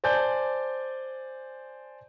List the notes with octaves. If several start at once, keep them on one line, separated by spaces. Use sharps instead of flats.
C5 D5 G#5 A5 G6